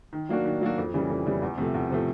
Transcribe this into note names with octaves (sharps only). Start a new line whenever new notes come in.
D#3
F#3 A#3 D4 F#4
D#3
F#3 A#3 D4 F#4
F2
C#3 E3 G3
F2
C#3 E3 G3
E2
C3 F3 A3
E2
C3 F3 A3